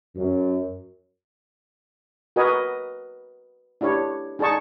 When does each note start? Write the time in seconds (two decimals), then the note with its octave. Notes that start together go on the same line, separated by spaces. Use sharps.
0.15 F#2
2.36 F#4 A#4 B4 D#5 G#5
3.81 D4 E4 G4 C#5
4.39 D#4 G#4 D5 A5 C#6